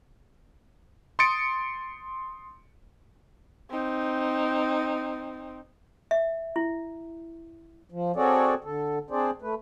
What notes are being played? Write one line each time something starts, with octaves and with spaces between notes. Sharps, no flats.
C6 D#6 A6 C#7 D7
C4 D#4
E5
E4
F3
C4 F#4 G#4 A4 C#5 D5
D3 A4
C4 D4 G#4 C5 D5
A3 B4